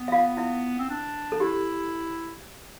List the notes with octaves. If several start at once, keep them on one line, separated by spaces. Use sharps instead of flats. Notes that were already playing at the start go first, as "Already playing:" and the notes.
Already playing: B3
E5
F4 F5
E4 E5
C4
D4
A4
E4 G4